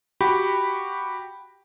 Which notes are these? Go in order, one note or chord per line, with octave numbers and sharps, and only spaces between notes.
F#4 G4 G5 B5